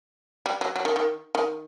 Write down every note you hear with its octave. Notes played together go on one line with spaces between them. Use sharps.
G3
F#3
F#3
D#3
D#3
D#3